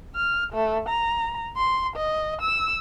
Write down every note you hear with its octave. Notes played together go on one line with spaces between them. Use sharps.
F6
A3
A#5
C6
D#5
E6